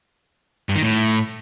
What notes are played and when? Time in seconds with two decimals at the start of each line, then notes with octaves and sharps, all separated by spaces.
0.69 G2
0.76 D#3
0.82 A2